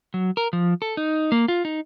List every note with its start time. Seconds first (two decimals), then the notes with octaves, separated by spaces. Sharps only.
0.14 F#3
0.37 A#4
0.53 F3
0.82 A4
0.97 D#4
1.32 A#3
1.48 F4
1.65 D#4